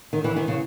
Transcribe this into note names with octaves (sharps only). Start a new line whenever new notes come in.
D#3
E3
D#3
C#3